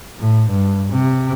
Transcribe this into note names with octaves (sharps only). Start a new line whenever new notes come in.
A2
G2
C3